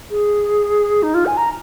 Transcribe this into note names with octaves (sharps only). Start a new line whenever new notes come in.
G#4
D#4
F4
G#5
A#5